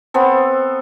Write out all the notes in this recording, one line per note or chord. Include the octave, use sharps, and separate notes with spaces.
B3 C4 A4